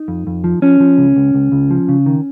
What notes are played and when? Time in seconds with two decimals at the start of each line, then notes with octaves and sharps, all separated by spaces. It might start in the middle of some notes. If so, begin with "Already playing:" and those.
Already playing: D#4
0.08 F2
0.27 F2
0.44 F3
0.62 F3 C#4
0.80 F3
0.98 C#2
1.16 C#2
1.34 C#2
1.52 C#2
1.71 F3
1.89 C#3
2.06 D#3